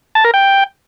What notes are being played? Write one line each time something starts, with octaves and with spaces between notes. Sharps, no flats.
A5
A#4
G5